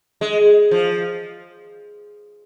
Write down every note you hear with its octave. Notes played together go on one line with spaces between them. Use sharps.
G#3
F3